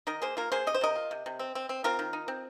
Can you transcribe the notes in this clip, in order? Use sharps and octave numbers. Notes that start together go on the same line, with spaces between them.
D#3 A#4 D#5
A#3 G#4 C5
A#3 F4 A#4
A#3 G#4 C5
C3 D#5
C5
C3 A#4 D#5
F4
C3
C3
C4
C4
C4
C4 F4 A#4
D#3
D#4
C4